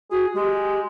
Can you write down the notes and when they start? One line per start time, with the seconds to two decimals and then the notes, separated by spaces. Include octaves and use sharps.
0.11 F#4 G#4
0.35 G#3 G4